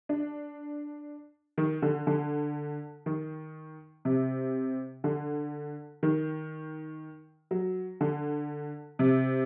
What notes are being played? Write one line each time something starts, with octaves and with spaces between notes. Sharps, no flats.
D4
D#3
D3
D3
D#3
C3
D3
D#3
F#3
D3
C3